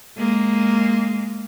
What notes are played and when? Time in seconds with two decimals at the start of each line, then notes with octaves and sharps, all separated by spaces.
0.18 G#3 A#3